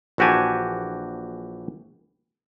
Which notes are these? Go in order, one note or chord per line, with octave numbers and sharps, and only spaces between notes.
A#1 E3 F#4 G4 G#5 A5